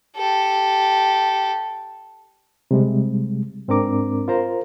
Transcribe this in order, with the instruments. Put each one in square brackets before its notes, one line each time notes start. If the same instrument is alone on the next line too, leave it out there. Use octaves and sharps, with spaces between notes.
[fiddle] G4 A4
[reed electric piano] C3 G3 G#3
G#2 C4 D4 A#4 A#5 D6
F4 A#4 C5 A#5